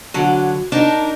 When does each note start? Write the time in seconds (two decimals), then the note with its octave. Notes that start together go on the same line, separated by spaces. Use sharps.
0.14 D3 F#3
0.72 D4 D#4 A#4